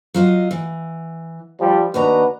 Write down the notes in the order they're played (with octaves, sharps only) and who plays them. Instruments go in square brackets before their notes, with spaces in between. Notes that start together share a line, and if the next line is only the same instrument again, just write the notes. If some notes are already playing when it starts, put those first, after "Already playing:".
[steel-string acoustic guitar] F#3 F4 D#5
E3
[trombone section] F3 G3
[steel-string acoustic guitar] D#2 D#5 A#5 [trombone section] D4 F#4 B4